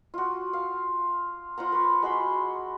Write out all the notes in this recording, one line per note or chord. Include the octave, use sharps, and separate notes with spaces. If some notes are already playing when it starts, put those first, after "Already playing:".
F4 F#4
F5
F4 C5 F#5 A#5
B4 C5 C#6
G#3 F#4 B5 C6